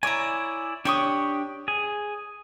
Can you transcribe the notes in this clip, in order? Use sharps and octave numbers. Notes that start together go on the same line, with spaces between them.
E4 C#5 D5 G#5 A#5
D4 G4 C#5 G5 C#6 D#6
G#4